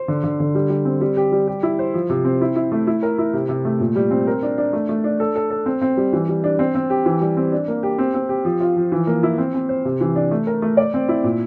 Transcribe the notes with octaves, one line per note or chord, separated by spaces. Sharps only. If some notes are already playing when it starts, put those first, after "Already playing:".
Already playing: C5
D3
D3
D3
G3
G3
C4
G3
G4
G3
G4
E4
C5
F3
C3
C4
E4
E4
A3
E4
A#4
E4
C3
C3
A3
A#2
G3
C4
A#4
D4
D4
A3
A3
D4
A4
A4
A4
C4
C4
G3
E3
G3
D4
C4
C4
G4
E3
G3
C4
D4
A#3
G4
C4
C4
G4
F3
F4
F3
E3
A#3
E4
C4
C4
C5
C3
E3
D4
A3
A#4
A3
D5
C4
E4
A#2